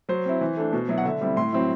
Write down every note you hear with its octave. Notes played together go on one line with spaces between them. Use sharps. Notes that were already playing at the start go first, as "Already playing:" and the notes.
F#3 C5
C4 E4
E3
A3 D4
B2
F#3 B3 E4
F#5
D3 E5
G3 C4 E4
A2 C6
F#3 C4 E4